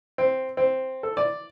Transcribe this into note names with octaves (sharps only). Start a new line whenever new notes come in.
C4
C4
A4
D5